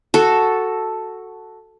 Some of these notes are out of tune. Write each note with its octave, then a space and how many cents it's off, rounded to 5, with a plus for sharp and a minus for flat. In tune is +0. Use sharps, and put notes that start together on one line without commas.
F#4 +0 A4 +0